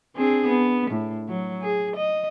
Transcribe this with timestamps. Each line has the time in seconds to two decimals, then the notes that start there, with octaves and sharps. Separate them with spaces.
0.16 C4 D4 G#4
0.47 B3
0.91 A2
1.29 F#3
1.62 G#4
1.96 D#5